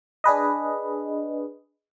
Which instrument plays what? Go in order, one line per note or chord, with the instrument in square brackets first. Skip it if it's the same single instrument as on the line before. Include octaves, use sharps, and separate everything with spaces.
[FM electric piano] D4 G#4 B4 D#5